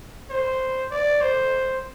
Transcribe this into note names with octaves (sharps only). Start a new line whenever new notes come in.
C5
D5
C5